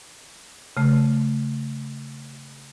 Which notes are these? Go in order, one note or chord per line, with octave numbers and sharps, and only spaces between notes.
C#3 A3